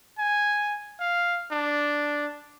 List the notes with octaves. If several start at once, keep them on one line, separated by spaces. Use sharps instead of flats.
G#5
F5
D4